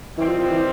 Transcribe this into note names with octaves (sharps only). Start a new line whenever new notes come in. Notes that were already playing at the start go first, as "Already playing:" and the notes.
D#3 E3 G3 C4
F3
F3
E3